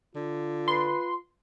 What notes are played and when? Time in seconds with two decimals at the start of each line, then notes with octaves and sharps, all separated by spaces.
0.16 D3 F4
0.68 B4 C6